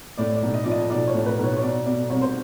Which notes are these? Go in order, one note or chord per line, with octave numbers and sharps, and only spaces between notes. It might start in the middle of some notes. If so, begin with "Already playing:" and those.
A2 D5
D5
B1
D#5
F3 D5
D#5
B1 D5
C#5
A2
B4
B1
C#5
C#5
B2 D5
B2 D5
C2 C#5
C5